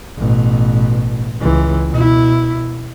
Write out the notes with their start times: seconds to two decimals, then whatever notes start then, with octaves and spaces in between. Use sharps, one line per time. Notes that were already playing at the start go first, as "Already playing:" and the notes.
0.17 A1 B2
1.41 C#2 E3
1.90 B2 E4